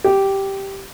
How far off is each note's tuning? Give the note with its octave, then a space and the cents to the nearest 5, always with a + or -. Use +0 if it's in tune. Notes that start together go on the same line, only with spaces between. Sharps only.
G4 -5